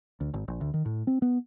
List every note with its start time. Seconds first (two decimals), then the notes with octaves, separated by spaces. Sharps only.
0.20 D2
0.34 G#1
0.48 A#1
0.61 D2
0.74 D#3
0.85 A2
1.07 C4
1.22 B3